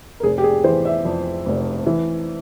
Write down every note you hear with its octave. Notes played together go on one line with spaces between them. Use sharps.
A#4
F1 G#4
G4
G#4
E3 C5
E5
F2
F1
E3